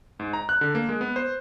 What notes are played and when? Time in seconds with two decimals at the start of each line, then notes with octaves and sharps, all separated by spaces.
0.20 G#2
0.33 A#5
0.49 F#6
0.61 D3
0.75 A#3
0.89 G#3
1.01 B3
1.16 C5